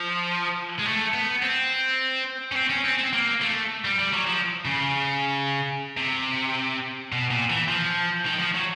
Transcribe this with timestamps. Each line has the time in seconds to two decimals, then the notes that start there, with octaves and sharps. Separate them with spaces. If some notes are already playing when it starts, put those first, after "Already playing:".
Already playing: F3
0.79 G#3
0.86 A3
1.14 B3
1.42 C4
2.52 C#4
2.56 C4
2.70 C#4
2.85 C4
2.99 C4
3.13 A#3
3.41 A3
3.85 G3
3.99 G3
4.13 F#3
4.27 F3
4.65 C#3
5.97 C3
7.12 B2
7.31 A#2
7.50 E3
7.69 F3
8.25 D#3
8.39 F3
8.54 F#3